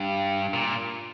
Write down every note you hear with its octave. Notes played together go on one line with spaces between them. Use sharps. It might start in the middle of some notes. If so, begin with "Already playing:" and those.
Already playing: G2
A#2